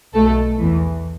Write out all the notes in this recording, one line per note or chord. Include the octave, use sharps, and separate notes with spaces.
B1 B2 A3 A4
E2 E3